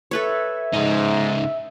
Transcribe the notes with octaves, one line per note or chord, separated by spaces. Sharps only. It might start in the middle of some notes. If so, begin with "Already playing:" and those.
A4 B4 C#5 E5
G#2 C#3 D#4